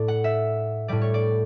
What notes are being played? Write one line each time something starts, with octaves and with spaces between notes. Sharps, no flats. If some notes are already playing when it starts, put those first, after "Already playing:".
Already playing: A2 D5
F#5
E5
A2 G3 D5
C#5
D5